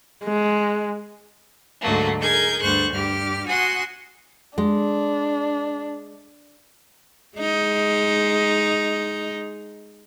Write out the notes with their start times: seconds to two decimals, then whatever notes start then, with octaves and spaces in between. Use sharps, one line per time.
0.24 G#3
1.82 D2 G#2 D3 F#3 A3 A#3
2.20 D#4 G#4 A#4 G6 G#6
2.63 D2 G2 C5 C#6 F#6
2.92 G2 G4 F6
3.46 F#4 G#5 C6 D#6 F#6
4.58 G#3 D4
7.38 G#3 D#4